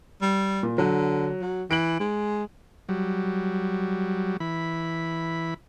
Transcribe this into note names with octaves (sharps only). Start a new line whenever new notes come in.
G3
A#2
D3 F#3
F#3
E3 D7 F#7
G#3
F#3 G3
E3 B5